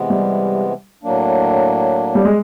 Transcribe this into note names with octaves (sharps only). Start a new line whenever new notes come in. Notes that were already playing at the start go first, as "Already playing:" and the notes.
Already playing: C3 E3 G#3 B3
G3
A2 F#3 A#3 D4
G3
G#3